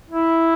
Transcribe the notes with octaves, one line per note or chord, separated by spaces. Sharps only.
E4